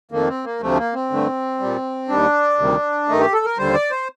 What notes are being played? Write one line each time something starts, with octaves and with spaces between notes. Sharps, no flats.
F2 D#3 A3 A#3
C4
A#3
D2 C3 F3 A3
A#3
C4
G2 D3 A3
A#2 G3
D#2 D#3 G3 D4
D2 C3 D#3 G3
G2 D#3 A3 D#4
G4
A4
A#4
D#2 D3 G3 C5
D5
C5